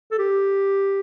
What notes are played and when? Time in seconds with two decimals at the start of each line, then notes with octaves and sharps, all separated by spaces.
0.11 A4
0.18 G4